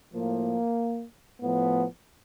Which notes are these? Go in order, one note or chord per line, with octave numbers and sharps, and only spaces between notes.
A2 F3 A#3
A2 F3 B3